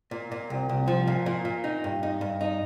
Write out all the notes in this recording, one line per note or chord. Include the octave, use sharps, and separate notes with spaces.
A#2
A#2
C2
C2
F3
A#2
A#2
A#2
D#4
G2
D#4
G2
D#4